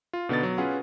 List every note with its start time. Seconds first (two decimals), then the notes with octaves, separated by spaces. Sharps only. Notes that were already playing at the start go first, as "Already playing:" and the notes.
0.13 F4
0.29 B2 D3 B3 D#4 A6
0.43 F#3
0.58 C#4 F4 G#4 B4 F#5